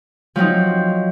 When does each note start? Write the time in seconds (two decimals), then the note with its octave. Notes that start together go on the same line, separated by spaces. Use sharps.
0.36 F3 F#3 C4 D#4